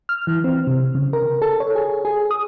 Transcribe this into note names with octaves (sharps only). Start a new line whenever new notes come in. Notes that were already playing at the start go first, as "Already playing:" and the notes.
F6
E3
C4
C3
C#3
A#4
A4
C#5
G#4
G#4
D#6